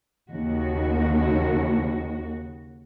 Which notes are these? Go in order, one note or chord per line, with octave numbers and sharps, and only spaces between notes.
D#2 C#3 F#4